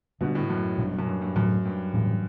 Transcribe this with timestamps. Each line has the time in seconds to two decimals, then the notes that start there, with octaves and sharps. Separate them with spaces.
0.21 B2 D3 G3 B3 D4
0.35 A2
0.50 F#2
0.78 B2 G3 D4
0.99 F#2
1.07 G2
1.21 G2
1.36 F#2 A2 F#3 A3
1.65 G2
1.93 A2 E3 G3